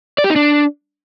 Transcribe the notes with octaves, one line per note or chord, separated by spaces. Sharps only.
D5
G4
D#4
D4